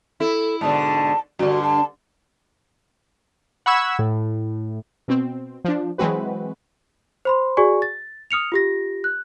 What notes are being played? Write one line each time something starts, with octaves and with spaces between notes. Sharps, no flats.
E4 A4
G#2 B2 D3 A5
G2 D3 F#4
A5
F#5 B5 C#6 E6 G#6
A2
B2 C4
F3 D4
E3 F#3 G#3 C4 F#4 B4
C5 B5 C6
F#4 G#4 D5 G#5 C#6
A6
D#6 F6 C#7 F7
F4 G4 A#6
F#6